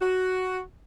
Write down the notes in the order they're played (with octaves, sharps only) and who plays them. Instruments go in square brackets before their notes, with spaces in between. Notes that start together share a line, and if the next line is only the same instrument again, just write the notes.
[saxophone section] F#4